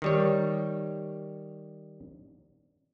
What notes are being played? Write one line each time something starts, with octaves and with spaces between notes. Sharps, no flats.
D#3 G3 C#5